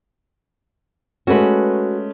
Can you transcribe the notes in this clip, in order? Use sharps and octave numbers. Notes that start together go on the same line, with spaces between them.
G#3 A3 C#4 F#4 B4